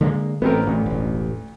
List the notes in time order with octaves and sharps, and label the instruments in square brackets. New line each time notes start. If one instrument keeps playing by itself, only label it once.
[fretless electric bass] D3 G#3 A#3
[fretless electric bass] A1 [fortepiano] B3 C4 A#4
[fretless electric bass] A1 [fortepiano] D2 D3
[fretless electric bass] E1 A1